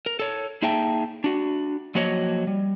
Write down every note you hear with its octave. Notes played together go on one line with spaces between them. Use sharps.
A#4
A4 C#5
A#3 D#4 G#4 E5 G5 A5
D4 F#4
F3 F#3 A#3 F#4 C#5 D#5
G3